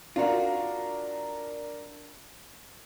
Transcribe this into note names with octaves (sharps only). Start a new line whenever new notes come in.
D4 F4 F#4 A#4